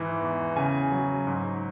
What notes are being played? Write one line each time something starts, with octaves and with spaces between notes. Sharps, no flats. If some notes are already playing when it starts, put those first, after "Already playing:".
Already playing: G#2 E3
E2
C#3 G#5
F#3
G#2